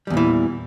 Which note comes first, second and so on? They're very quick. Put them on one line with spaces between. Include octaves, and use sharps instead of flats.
G3 E2 A#2 E3